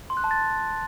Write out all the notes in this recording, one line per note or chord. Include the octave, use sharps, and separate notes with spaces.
C6
F#6
A5
A6